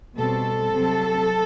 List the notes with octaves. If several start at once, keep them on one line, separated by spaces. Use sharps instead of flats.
B2 G3 C4 A4
C3 F#3 C4